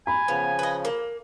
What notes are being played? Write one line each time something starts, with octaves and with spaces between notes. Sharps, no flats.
G#5 B5
C#3 F3 B3
B4 D#5
A#3